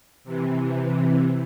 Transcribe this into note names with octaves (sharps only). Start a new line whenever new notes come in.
C3 E3